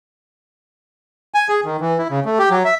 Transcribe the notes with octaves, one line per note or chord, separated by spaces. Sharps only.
G#5
G#4
D#3
E3
E4
C#3
A3
G4
F#3
E5